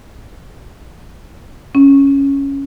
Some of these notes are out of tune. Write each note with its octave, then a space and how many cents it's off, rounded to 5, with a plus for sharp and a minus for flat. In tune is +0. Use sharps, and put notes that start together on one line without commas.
C#4 +0